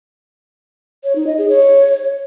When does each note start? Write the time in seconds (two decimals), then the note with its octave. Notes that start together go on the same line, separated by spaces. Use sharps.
1.04 C#5
1.16 D#4
1.27 D#5
1.38 G#4
1.49 C#5